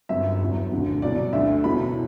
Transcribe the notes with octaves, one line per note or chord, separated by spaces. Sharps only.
G1 F#2 F#3 E5
E1 E2 B2 F#3
E1 D2 D3 F#3
C2 B2 F#3 D5
D2 D3 F#3 E5
F#1 E2 B2 F#3 B5